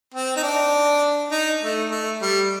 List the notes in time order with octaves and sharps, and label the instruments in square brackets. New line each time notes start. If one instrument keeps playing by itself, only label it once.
[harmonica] C4
D#4
D4
D#4
A3
A3
G3